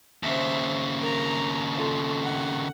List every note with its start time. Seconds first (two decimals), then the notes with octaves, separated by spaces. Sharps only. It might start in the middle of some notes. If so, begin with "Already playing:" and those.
0.23 D#2 C#3 C5 E5
0.98 A#4 A#5
1.74 F4 A4
2.23 F#5